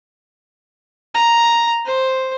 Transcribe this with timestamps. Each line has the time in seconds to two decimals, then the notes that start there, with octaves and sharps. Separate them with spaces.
1.15 A#5
1.86 C5